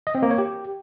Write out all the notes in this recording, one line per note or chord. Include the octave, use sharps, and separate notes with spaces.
D#5
C4
A#3
C#5
G4